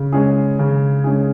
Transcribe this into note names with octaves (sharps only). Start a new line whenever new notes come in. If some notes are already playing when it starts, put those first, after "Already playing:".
Already playing: C#3
G#3 C#4 G#4
C#3
G#3 C#4 G#4